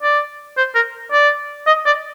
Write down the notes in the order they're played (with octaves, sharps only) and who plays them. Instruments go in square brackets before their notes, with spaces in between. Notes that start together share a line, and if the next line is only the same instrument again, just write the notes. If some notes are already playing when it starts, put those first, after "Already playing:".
[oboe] D5
C5
A#4
D5
D#5
D5